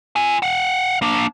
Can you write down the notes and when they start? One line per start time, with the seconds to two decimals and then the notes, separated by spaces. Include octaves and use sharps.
0.16 F4 G#5
0.42 F5 F#5
1.02 A#3 D4